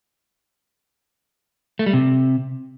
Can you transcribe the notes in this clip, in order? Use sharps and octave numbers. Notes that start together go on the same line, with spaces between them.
A3
G3
C3